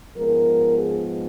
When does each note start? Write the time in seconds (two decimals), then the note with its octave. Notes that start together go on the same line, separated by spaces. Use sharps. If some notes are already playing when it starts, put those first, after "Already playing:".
0.16 G#2 F3 G#3 B3 A#4
0.77 G#4